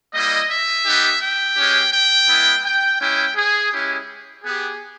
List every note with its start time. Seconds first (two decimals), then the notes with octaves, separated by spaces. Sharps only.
0.14 G3 A#3 E4 D#5
0.50 E5
0.86 B3 D#4 G4
1.22 G5
1.57 G#3 C#4 G4
1.93 G5
2.29 G#3 B3 E4
2.65 G5
3.00 G#3 C#4 E4 G5
3.36 G#4
3.72 G#3 C#4 E4 G4
4.44 B3 G4 G#4